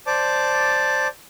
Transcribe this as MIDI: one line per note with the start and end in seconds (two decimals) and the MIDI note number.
0.07 1.08 72
0.07 1.08 74
0.07 1.08 81
0.07 1.08 86